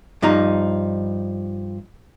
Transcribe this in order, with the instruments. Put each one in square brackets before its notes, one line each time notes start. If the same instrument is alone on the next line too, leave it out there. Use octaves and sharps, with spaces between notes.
[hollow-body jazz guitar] G2 F3 D#4 A#5